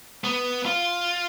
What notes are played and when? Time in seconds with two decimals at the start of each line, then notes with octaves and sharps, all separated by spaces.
0.24 B3
0.66 F4